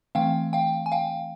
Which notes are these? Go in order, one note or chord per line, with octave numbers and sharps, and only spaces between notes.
E3 A3 C4 F5 G5
F5 G5
G#5
F5 G5